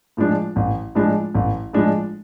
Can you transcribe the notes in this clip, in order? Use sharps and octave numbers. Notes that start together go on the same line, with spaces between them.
A2 F3 G#3 D4
A1
A2 F3 G#3 D4
A1
A2 F3 G#3 D4